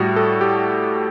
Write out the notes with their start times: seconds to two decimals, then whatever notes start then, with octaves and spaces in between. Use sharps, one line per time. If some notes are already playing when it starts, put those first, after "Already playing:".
Already playing: A2 G3 F#4
0.16 A4
0.41 G4